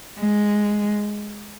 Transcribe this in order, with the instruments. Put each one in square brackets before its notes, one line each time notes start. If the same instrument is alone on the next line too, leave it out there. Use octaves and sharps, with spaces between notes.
[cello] G#3